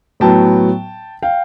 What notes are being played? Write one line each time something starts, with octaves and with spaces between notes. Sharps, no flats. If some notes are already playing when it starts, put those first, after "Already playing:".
A2 F#3 B3 G5 A5
F5 G5